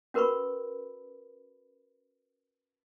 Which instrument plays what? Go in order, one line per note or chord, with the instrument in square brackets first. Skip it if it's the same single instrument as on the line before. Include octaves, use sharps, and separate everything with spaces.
[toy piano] C#4 F#4 A#4 B4 B5 C#6